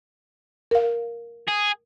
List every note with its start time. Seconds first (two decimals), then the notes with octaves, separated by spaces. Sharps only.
0.71 A#4 F5
1.48 G#4